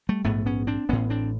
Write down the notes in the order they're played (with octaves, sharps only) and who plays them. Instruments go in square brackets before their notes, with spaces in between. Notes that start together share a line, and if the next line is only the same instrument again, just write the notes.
[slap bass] G3 A3
A#1 G#2 A3 B3
B3 C#4
C4 D4
A1 A2 B3 C#4
C4 D4